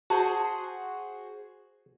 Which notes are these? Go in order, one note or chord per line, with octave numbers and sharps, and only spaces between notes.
F#4 G#4 C5 A5